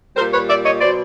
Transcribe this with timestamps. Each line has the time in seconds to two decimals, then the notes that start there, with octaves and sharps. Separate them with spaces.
0.16 G3 A#4 C5
0.21 A#2
0.32 B4 C#5
0.49 D5 E5
0.64 C#5 D#5
0.80 B2 F#3 C5 D5